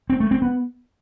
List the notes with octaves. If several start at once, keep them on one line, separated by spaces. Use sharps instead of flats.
C4
A3
C4
B3